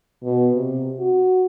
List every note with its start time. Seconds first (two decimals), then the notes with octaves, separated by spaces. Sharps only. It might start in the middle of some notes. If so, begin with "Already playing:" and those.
0.23 B2
0.55 C3
0.99 F#4